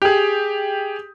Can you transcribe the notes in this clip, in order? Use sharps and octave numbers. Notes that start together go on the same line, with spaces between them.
G4 G#4